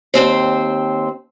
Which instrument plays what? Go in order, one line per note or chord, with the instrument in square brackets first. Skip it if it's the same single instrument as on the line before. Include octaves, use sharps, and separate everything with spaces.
[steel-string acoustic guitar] D#2 B2 C4 C5